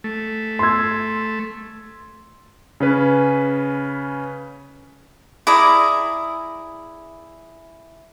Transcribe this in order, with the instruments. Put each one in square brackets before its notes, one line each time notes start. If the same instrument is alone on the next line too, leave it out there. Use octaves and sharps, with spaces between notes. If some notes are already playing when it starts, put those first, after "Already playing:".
[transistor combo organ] A3
[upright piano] C6 E6 G#6
[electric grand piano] C#3 C#4 B4
[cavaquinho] E4 G#4 D5 A#5